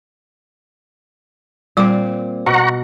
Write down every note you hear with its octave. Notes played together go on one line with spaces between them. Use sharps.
A#2 G3 C4 D6
B2 F#5 A#5 C#6